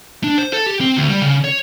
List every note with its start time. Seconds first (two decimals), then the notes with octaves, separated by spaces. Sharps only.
0.24 D4
0.38 C5
0.53 A4
0.67 G4
0.81 C4
0.97 D2
1.09 G3
1.22 C#3
1.44 C#5